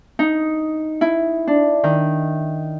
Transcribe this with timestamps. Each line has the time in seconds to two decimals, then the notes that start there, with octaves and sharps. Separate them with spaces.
0.19 D#4
1.01 E4
1.47 D4
1.84 D#3